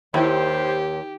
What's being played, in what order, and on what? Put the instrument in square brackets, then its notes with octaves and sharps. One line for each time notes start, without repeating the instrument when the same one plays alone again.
[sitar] D#2 [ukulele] E4 G5 B5 [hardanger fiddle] G4 [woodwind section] C5